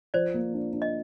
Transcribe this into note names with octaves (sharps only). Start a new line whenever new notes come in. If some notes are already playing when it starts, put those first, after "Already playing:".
F3 C5 D5
A#3
D4
D4
D#5